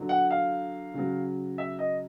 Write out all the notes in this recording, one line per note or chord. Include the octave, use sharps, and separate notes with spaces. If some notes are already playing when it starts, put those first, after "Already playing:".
Already playing: D3 F#3
F#5
F5
C#3 F#3
E5
D#5